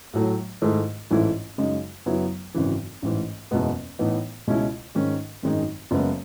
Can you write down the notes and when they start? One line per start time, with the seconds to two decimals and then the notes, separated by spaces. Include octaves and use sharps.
0.14 A2 F#3 A3 E4
0.62 G#2 D#3 A3 E4 G#4
1.11 A1 G#2 E3 A3 E4
1.58 F#2 C#3 G#3 D#4
2.06 F#2 C#3 F#3 B3 E4
2.54 G#1 F#2 C#3 E3
3.02 A1 G#2 E3
3.51 F#1 E2 B2 G#3 B3
3.99 A2 E3 B3 D#4
4.47 C#2 B2 G#3 C#4 E4
4.95 G#2 D#3 G#3 C#4
5.43 G#1 F#2 D#3 G#3 D#4
5.91 F#1 F#2 C#3 G#3 B3